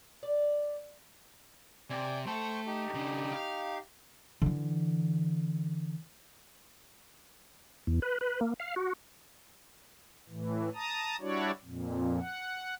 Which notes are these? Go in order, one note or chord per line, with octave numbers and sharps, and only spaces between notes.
D5
C3 D5 G#5
A3 C5 G5 A5 C#6
D#4 G4
C#3 D4
F5
D3 E3
E2
B4
B4
A#3
F5
F#4
A2 E3
A5 A#5 D#6
G3 D4 E4 F#4 C#5 D5
F2 A#2
F#5